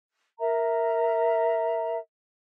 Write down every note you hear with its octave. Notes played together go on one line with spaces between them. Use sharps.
A#4 E5 A#5